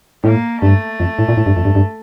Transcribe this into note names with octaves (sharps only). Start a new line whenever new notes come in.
A2 A#3
G2 A3
F2
A2
A#2
A2
G2
F2
G2
G2